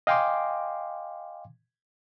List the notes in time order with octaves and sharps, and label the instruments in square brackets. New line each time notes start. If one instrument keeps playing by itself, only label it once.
[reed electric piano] D#5 F5 G5 G#5 C6 D6